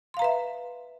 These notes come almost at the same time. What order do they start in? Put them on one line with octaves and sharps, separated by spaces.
C6 F5 A#5 B4 E5